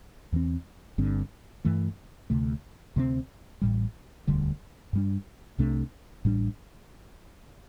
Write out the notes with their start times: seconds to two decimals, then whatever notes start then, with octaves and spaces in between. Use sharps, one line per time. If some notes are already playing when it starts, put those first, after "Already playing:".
0.32 E2 E3 C4
0.98 G1 G2 D3 C4
1.65 G2 E3 A3
2.30 D2 C3 A3
2.96 D2 C3 G3 C4
3.61 A1 A2 G3
4.27 E1 D2 D3 G3
4.93 G2 G3 D4
5.58 C2 C3 A3 D4
6.25 A1 A2 G3 D4